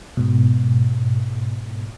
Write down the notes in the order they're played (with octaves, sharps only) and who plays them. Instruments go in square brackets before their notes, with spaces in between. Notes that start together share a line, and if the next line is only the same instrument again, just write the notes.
[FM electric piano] G#2 B2